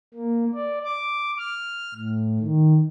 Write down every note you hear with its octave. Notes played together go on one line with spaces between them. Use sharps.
A#3
D5
D6
F6
A2
D#3